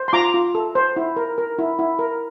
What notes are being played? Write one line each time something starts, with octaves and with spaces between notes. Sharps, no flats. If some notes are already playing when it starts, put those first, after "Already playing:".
Already playing: C5
C6
F4 A#5 D6
F4
A4
C5
E4
A#4
A#4
E4
E4
A#4